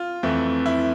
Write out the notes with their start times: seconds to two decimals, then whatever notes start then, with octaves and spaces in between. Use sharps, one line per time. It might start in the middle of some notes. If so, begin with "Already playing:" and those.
Already playing: F4
0.23 F2 E3 A3 C4
0.66 E4